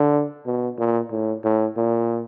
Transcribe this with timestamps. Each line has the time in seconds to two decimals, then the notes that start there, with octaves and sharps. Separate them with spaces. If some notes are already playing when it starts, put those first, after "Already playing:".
Already playing: D3
0.46 B2
0.78 A#2
1.11 A2
1.44 A2
1.77 A#2